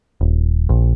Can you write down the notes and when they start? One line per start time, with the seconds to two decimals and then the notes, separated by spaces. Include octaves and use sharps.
0.21 D#1
0.69 A#1